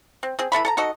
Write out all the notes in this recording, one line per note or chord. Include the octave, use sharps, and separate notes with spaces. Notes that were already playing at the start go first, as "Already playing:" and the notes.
C4
C4 G#4
E3 A4 E5 B5
A4 A5 A#5
D#4 F#4 A4 D#5